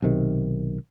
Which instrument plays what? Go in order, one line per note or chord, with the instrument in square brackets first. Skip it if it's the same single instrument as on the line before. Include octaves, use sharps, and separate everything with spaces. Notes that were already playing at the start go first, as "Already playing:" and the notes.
[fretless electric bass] B1 C3 D#3